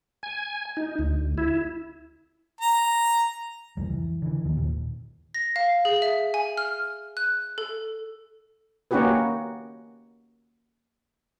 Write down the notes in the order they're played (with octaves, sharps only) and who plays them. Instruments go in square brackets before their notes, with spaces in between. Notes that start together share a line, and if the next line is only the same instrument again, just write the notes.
[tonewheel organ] G#5
D#4
D2
E4
[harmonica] A#5
[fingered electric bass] C2 F2 G3
E3
D3 E3
D#2 D#3
D#2 A#2
[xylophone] A#6
F5
G#4
E5
G#5
F6
F#6
A4
[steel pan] A#3 C#4 D#4 F#4 G4 B4